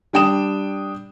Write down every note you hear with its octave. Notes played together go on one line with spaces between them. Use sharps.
G3 D4 G5 D#6 E7